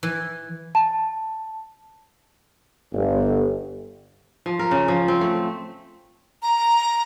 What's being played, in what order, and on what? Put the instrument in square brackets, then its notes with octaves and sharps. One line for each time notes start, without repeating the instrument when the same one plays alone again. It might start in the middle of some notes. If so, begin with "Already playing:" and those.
[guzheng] E3
[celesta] A5
[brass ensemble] G1
[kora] F3
A#4
C#3
F3
C4
A3
[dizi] A#5